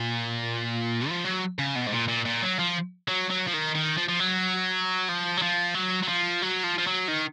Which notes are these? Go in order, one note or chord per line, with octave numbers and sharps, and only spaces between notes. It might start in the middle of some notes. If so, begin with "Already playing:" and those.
Already playing: A#2
F3
F#3
C#3
B2
G#2
A#2
A#2
A#2
F#3
F3
F#3
F#3
F3
D#3
D#3
F3
F3
F#3
F3
F#3
F3
F#3
F#3
F3
F#3
F3
F3
F#3
D#3